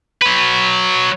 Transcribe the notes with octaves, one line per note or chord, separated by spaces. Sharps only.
F#3 B4